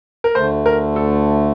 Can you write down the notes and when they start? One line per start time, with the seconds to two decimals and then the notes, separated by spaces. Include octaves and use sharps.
0.24 A#4
0.35 D2 D3 A3 C5
0.66 A#4
0.96 A4